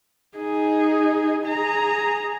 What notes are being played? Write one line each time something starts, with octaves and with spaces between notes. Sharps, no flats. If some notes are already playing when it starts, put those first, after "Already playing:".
D#4 G#4
G#4 A#5